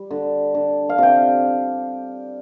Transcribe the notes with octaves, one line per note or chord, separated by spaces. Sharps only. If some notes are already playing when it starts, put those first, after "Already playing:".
Already playing: G3
D3
D3
F5
C3 G5